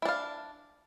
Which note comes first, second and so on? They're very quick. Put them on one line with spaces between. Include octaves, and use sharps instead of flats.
E4 D4 F5